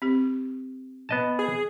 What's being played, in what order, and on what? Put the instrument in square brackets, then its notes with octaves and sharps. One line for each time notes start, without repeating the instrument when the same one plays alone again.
[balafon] C4 G4
[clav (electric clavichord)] B3 D#5 A5
[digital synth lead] G#4